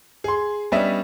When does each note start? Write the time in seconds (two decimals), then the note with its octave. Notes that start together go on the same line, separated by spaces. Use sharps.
0.24 G#4 C6
0.72 G3 B3 C#4 D4 D#5 E5